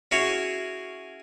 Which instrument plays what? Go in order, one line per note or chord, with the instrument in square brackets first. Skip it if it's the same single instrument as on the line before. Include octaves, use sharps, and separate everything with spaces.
[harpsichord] C#4 E4 F#4 G#4 C#5